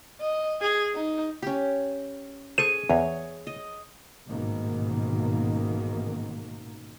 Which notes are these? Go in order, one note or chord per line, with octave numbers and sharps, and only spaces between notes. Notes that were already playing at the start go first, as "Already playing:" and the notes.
D#5
G#4
D#4
C#4 G4
G#4 A4 C5 C#6 D#7
E2 C#5
D#5
A1 G#2 B2 D#3 A#3